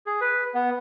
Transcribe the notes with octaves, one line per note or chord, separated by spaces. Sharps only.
G#4
B4
B3